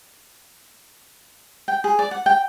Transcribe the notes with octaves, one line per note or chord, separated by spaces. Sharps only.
G5
G#4
D5
F#5
G5